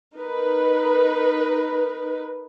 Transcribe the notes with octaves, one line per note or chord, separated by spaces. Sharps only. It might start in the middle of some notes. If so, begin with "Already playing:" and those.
D#4 A#4 B4